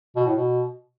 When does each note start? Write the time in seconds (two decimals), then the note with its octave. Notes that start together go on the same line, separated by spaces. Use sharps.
0.16 B2
0.26 A2
0.36 B2